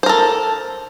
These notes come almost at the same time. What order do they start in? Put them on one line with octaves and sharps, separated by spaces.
C5 A#4 A4